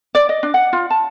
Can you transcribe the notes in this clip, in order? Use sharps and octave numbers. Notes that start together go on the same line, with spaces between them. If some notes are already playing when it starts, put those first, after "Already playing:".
D5
D#5
D4
F#5
F4
A5